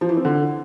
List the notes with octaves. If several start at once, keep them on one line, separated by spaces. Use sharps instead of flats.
F3
E3
C4
D3